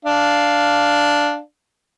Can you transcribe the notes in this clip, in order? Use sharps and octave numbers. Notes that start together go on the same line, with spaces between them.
D4 F5